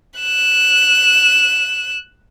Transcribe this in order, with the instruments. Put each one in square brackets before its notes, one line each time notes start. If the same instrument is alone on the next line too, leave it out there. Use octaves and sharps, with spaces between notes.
[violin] F#6 E7